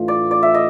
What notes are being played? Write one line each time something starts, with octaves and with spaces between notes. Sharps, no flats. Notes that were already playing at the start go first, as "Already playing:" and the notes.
Already playing: A2 E3 A3 D4 F4
D5
D5
E5
D#5